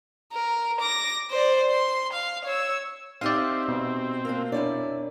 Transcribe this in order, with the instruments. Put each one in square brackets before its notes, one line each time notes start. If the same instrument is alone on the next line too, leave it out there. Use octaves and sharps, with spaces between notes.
[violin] A#4
D6 A#6
C5 D5
C6
F5
C#5 E6
[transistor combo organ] C4 [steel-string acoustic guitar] D#4 G4 E5 [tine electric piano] D5 F5
[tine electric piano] B2
[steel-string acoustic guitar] A#3 D4 F4
[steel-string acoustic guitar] F2 E4 D5 [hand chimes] D4 A#4 C#5